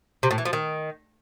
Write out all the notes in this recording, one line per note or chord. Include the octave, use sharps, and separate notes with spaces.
C3
A2
E3
F3
D#3